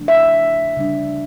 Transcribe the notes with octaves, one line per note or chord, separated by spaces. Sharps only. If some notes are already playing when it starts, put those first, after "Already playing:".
Already playing: C#3 F3 A3 D4
E5
C#3 G3 D4